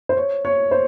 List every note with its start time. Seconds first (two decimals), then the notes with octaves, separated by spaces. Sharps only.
0.09 C5
0.17 C#5
0.45 C#5
0.71 C5